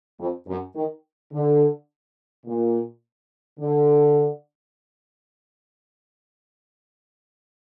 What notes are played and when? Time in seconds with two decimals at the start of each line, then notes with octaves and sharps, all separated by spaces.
0.20 F2
0.48 F#2
0.76 D#3
1.33 D3
2.46 A#2
3.60 D3